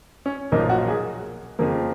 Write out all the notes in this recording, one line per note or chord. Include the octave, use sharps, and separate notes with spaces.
C#4
B1 A#2 F3 A#3 D#4
F#4
G#4
F2 C#3 F3 A#3